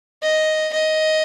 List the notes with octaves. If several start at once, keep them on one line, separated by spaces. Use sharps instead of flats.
D#5
D#5